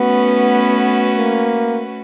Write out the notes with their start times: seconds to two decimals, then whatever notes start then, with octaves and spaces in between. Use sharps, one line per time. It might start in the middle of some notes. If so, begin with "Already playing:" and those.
Already playing: A3 B3 C#4 F#4 B4
1.15 A#3